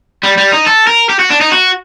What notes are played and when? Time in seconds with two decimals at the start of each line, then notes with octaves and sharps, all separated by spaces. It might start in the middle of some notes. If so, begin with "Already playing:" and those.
0.23 G3
0.38 G3
0.52 D#4
0.66 A4
0.87 A#4
1.09 G4
1.19 F#4
1.30 D4
1.41 D#4
1.52 F#4